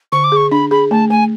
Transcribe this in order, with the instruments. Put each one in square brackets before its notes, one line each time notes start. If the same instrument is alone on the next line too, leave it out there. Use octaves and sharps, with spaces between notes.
[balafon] D3 [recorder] C#6
[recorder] D6
[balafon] G#4 [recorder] C#6
[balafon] D4 [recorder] B5
[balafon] G#4 [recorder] B5
[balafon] A3 [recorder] A5
[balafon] A3 [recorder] G#5